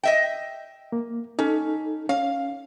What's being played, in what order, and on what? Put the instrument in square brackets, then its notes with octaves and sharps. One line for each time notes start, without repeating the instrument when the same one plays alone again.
[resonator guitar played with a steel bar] D#5 E5 G5
[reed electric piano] A#3
[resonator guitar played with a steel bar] C#4 [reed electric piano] D#4 A4
[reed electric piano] C#4 [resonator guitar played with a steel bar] F5